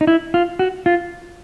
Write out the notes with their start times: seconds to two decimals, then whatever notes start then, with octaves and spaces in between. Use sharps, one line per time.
0.01 D#4
0.07 E4
0.34 F4
0.59 F#4
0.86 F4